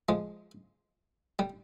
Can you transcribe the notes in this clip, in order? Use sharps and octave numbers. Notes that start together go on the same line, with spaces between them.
F3 G#3
G3